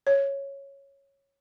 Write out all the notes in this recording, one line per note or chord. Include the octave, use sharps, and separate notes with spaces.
C#5